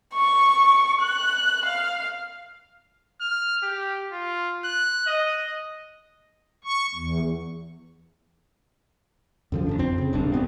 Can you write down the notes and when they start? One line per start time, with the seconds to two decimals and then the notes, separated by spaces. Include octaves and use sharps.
0.15 C#6
1.02 F#6
1.66 F5
3.21 F6
3.63 G4
4.12 F4
4.65 F#6
5.06 D#5
6.64 C#6
6.95 E2
9.52 F#2 D3 F3
9.67 A1 B2 D4
9.78 F2 C4
9.98 C#3
10.13 D1 C2 G2 D4
10.32 A1 F3 B3 C4